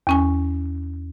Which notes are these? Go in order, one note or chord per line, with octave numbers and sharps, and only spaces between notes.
E2 C#4 G#5